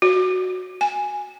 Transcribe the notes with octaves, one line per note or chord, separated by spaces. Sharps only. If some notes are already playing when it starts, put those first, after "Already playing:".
F#4
G#5